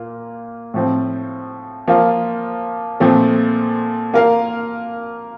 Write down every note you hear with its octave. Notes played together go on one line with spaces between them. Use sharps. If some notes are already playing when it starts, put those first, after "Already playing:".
Already playing: A#2 A#3 F4
A2 F3 C4
F3 A#3 F4
A#2 F3 A3 C4
A#3 F4 A#4 F5